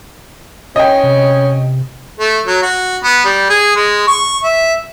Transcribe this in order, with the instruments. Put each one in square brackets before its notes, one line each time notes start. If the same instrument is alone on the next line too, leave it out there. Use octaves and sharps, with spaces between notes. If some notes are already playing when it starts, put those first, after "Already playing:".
[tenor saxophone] C#4 [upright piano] D#5 G5
[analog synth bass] C3
[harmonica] A3
F#3
F#4
B3
G3
G#4
G#3
C#6
E5